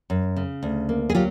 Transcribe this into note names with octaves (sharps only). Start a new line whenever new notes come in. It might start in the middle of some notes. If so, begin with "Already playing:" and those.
F#2
C#3
D2
A#3
G#4
F#3 F4 G4